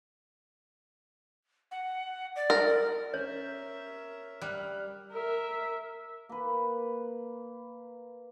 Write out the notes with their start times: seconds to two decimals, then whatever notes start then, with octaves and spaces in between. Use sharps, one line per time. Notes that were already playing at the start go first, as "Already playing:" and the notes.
1.71 F#5
2.36 D5
2.50 A#4
3.14 C#4 A#4 C#5 E5
4.42 G3 F6 F#6
5.11 A#4 E5
6.29 A#3 B4